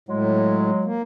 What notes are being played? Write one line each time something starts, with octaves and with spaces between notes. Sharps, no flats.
A2 F#3 G#3
A#3